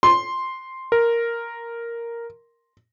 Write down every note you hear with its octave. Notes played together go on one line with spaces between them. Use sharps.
C6
A#4